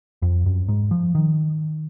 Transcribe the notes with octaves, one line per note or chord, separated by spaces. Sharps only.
F2
F#2
G#2
F3
D#3